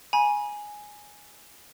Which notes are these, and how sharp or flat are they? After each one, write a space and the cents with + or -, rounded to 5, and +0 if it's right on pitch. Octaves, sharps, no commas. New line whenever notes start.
G#5 +0 B5 -40